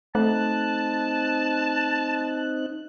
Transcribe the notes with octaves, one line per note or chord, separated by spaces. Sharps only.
A3 C4 D#4 A5 F#6